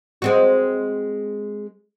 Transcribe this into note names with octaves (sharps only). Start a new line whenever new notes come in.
G#3 C4 F#4